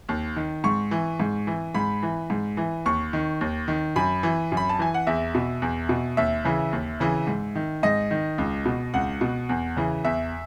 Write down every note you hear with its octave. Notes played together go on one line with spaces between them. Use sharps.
D#2
D#3
G#2 C#6
E3
G#2
E3
G#2 B5
E3
G#2
E3
D#2 C#6
D#3
D#2
D#3
F#2 B5
E3
F#2
B5
A5
E3 G#5
F#5
E2 E5
B2
E2
B2
D#2 E5
C#3 E3
D#2
C#3 E3
G#2
D#3
G#2 D#5
D#3
C#2
B2
C#2 F#5
B2
E2
C#3 E3
E2 E5